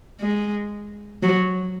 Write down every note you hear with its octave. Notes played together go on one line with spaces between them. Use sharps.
G#3
F#3